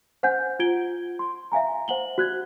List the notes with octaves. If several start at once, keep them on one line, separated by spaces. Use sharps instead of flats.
C5 F#5 G#5 G6
F4 G#6 D7 G7
C6
E5 F5 G#5 A#5
C5 F#5 F#7 G7
F#4 F#6 G#6